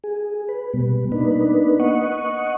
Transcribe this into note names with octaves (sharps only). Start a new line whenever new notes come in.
G#4
B4
B2 G3 B3
A#3 B3 D4 D#4 B4
D#5 F#5 C#6